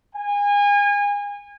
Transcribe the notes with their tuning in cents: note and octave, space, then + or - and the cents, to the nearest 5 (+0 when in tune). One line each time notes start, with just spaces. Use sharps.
G#5 -30